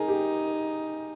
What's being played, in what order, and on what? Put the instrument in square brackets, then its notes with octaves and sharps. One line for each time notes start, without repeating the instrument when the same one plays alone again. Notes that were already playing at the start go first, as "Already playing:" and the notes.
Already playing: [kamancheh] D#4 [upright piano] G#4 A#4
[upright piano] G4